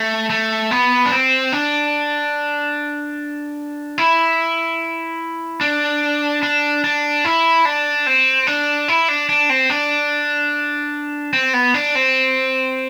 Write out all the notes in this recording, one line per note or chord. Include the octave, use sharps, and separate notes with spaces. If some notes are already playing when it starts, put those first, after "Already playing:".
Already playing: A3
A3
B3
D4
C4
D4
E4
D4
D4
D4
E4
D4
C4
D4
E4
D4
D4
C4
D4
C4
B3
D4
C4